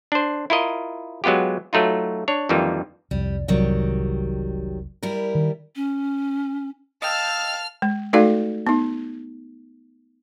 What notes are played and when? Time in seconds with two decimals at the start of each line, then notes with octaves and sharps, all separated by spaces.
0.12 D4 C5
0.50 E4 F4 A#4 D#5
1.24 F#3 G#3 B3 F4 G4
1.73 F#3 A3 D#4 F4
2.28 D4 C#5
2.49 F2 D#3 E3 G3 A#3 F4
3.11 C2 F2 G3
3.48 F1 C2 F2 D#3 F#3 G3
5.03 G3 E4 A#4
5.35 D#3
5.76 C#4
7.02 D#5 F5 G5 A5 E6 F6
7.82 G#3
8.13 A3 D#4 F#4 A4 D5 F5
8.67 B3 D#4